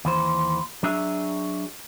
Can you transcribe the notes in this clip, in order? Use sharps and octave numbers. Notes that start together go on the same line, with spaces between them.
D#2 E3 C5
F#3 D4 G#4 E5